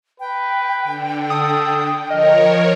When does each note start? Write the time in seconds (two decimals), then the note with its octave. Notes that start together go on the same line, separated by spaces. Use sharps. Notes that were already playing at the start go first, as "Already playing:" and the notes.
0.20 B4 G5
0.83 D3
1.30 A4 D#6
2.10 F3 A#4 C#5 D#5 F6